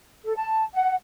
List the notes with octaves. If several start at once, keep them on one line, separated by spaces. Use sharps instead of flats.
A4
A5
F#5